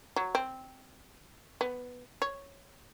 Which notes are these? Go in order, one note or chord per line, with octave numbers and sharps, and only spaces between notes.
F#3
C4
B3
C#5